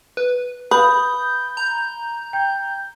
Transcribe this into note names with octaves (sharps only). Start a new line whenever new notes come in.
B4
B4 F5 B5 D#6 G6
A#5
G5 G6